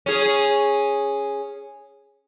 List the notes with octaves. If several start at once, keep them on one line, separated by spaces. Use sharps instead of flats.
C#4 G#4